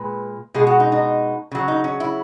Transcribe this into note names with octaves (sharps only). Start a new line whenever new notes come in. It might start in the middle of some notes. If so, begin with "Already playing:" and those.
Already playing: A#2 G#3 B4
B2 G#3 G#4
F#4
D#4
D#4
C#3 F#3
D#4
C#4
E4